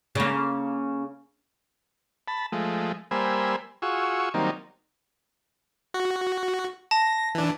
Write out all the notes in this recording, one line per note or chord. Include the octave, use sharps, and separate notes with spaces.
C#3 A#3
A5 B5
F3 G#3 A3
G3 A#3 C5 G#5 B5 E6
F4 F#4 G#4 C#6 E6
D#3 F#3 G3 A#3 C4 D#4
F#4
A5 A#6
E3 D4